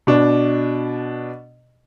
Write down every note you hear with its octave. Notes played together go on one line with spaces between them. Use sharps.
B2 D4